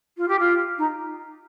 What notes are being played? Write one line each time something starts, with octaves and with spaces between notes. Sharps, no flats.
F4
G4
F4
D#4